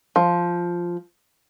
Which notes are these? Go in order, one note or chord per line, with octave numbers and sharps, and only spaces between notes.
F3